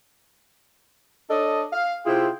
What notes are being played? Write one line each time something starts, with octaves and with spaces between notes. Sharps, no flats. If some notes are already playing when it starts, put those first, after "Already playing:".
D4 A4 C#5 D#5
F5
C3 E4 F4 G#4 G5